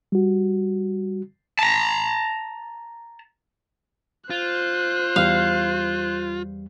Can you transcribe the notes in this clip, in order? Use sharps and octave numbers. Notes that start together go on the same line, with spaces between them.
G3 F#4
A5 A#5
F4 C5 F#6
E2 G3 F5